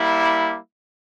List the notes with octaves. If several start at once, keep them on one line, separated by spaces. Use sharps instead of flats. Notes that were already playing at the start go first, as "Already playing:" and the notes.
Already playing: G3 A#3 E4